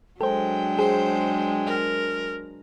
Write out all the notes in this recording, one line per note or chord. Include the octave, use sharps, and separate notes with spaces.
F#3 G#3 D4 A4 C5 G5
G#4 C5
A#4